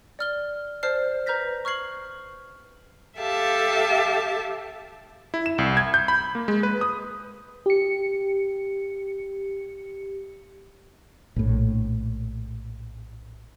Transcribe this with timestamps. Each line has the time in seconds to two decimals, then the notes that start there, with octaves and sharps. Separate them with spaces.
0.19 D5 F6 G7
0.83 C5 D5 A5 F6 C7
1.26 B4 A#5 F6 G6 A#6 B6
1.65 C#6 F6 G#6 C7 F#7
3.19 G4 A4 E5 F5 A5
5.34 E4
5.46 E7
5.58 C2
5.77 G#6
5.94 G6
6.08 B5
6.35 A#3
6.48 G#3
6.63 B4
6.81 D#6
7.66 G4 C#7
11.36 A#1 A2